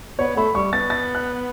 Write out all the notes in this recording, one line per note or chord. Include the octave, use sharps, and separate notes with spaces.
B3 C#5
A3 B5
G3 C#6
B3 A6
A6
F#6